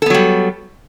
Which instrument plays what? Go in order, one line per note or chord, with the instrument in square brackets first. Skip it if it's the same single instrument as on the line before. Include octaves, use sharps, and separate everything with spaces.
[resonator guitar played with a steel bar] A4
B3
F#3
G3